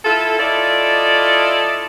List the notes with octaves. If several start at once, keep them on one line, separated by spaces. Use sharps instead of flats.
E4 F4 A4
E4 F4 A4 D5 D#5